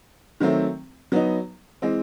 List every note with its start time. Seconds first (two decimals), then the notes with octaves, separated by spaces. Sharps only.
0.40 D#3 F#3 A3 C4
1.12 F#3 B3 D#4
1.82 E3 G#3 C4